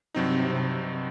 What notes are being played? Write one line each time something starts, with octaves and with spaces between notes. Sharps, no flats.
G2 C3 F#3 C4 D#4